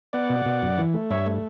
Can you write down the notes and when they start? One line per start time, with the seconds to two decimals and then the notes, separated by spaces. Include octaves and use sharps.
0.13 B3 D5 F#5
0.30 B2
0.46 B2
0.62 F#2
0.78 E3
0.94 A3
1.10 G2 C#5 E5
1.26 A3